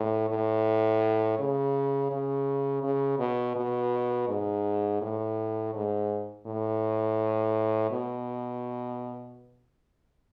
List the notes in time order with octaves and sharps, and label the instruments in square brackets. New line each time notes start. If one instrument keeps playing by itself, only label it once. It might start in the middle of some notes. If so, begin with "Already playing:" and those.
Already playing: [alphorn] A2
A2
C#3
C#3
C#3
B2
B2
G#2
A2
G#2
A2
B2